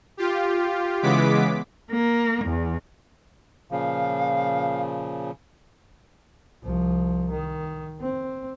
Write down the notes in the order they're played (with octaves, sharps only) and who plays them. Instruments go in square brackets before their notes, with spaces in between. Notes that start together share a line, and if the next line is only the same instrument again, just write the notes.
[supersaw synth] F4 G4
C#3 E3 G#3 B3 D6 B6
[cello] A#3
E2
[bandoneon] A#2 C#3 F3 [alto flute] F5
[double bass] C2 F3
D#3
C4